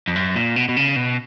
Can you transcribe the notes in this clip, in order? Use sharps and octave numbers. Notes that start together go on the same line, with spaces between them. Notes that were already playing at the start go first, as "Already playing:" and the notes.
F2
F#2
A#2
B2
B2
C#3
B2